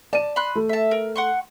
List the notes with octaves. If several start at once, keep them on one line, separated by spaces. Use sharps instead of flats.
D5 A5 D#7
B5 C6 F#6
A3
E5 A5
A#4
F#5 C6 C#6